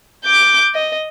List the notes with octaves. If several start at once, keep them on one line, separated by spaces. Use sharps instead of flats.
D6 G6
D#5